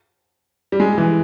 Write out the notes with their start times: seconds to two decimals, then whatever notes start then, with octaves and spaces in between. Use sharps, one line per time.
0.72 G3
0.80 G#3
0.98 E3